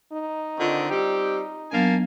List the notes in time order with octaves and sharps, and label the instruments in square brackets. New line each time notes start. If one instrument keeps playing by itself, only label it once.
[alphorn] D#4
[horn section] D3 D#3 C4 [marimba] F4 C#6
[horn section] G3 C4 G4
[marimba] F#3 B3 D4 [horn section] A#3 G#5 A5